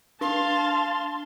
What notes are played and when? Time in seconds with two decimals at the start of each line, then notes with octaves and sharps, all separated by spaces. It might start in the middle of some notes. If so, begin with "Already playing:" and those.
0.21 D4 F5 A5 C6